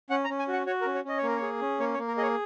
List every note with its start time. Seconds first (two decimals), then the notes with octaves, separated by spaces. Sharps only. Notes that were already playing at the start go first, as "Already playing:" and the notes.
0.10 C#4 F#5
0.24 A#5
0.30 C#4
0.39 G#5
0.48 F#4
0.53 F#5
0.66 F#4 C#5
0.81 A#4
0.86 C#4
0.95 C#5
1.05 C#4 D#5
1.18 C#5
1.23 A#3 A#4
1.36 C#5
1.42 G#4
1.61 C#4
1.80 A#3 C#5
1.94 C#5
1.98 A#3
2.08 A#4
2.17 G#4 C#5 D#5